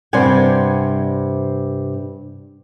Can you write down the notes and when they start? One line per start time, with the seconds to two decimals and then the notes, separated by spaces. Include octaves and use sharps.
0.13 G2 C3 C5 D5 F#5 G#5